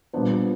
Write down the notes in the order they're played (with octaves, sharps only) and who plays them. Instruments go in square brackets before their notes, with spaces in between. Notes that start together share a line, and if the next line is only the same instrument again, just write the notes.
[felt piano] A#2 G3 B3 D4 C5